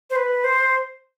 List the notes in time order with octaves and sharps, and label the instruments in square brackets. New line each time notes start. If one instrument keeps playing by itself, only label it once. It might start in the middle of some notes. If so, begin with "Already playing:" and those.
[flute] C5
B4
C5